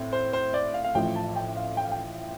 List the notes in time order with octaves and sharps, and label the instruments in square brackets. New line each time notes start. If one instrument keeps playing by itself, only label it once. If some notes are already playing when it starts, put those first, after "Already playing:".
Already playing: [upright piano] A2 C4
[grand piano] C5
C5
D5
F5
F5
[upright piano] A1 A2 F3 [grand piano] G5
[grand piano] A5
G5
F5
G5
F5
G5